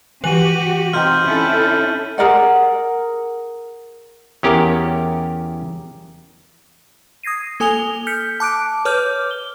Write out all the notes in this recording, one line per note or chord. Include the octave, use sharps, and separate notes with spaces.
E3 F#4 G4 D#7 F#7
C4 D#4 F4 F6 G6
C#4 E4 A4
G#4 A#4 D5 F#5
E2 C#4 G4 A#4
D#6 G#6 A#6 C7 D#7
A#3 A4 G#5 D#6 F7 G7
F6 G6 B6 C#7
A5 D6 F#6 D7
B4 C#5 D6 F6 G6
G7